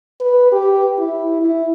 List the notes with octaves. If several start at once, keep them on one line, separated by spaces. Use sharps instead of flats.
B4
G4
E4
E4